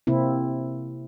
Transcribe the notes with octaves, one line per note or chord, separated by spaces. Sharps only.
C3 A#3 C4 E4